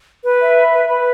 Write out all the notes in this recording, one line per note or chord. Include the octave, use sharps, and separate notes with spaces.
B4
E5
B5
B4
B4